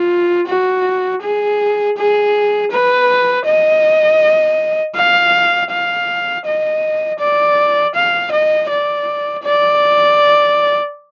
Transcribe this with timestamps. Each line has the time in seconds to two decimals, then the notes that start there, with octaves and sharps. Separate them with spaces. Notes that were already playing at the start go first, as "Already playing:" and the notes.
Already playing: F4
0.47 F#4
1.23 G#4
1.97 G#4
2.72 B4
3.46 D#5
4.96 F5
5.71 F5
6.46 D#5
7.20 D5
7.95 F5
8.32 D#5
8.70 D5
9.44 D5